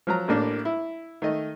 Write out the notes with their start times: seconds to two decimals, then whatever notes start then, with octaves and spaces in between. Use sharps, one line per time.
0.07 F3 F#3 A#5
0.28 A1 A2 A#3 D4
0.65 E4
1.22 D#3 A3 D#5